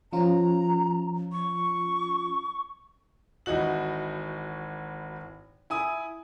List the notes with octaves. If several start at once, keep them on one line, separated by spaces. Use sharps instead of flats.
F3 C#4 F4 A#5
C#6
G#1 E3 D#4 F#4 F#7
E4 G#5 D#6